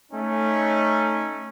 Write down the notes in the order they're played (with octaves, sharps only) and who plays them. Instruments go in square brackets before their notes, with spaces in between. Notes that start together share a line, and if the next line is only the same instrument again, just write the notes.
[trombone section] A3 C#4 D#4